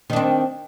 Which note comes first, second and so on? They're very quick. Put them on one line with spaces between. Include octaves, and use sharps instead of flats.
D#3 D4 C4